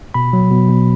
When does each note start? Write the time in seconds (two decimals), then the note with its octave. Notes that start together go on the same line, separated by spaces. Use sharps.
0.14 B2 B5
0.33 F#3
0.51 B2
0.69 B2